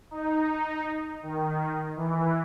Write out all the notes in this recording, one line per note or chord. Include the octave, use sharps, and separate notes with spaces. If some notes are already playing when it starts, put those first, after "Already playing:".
D#4
D#3
E3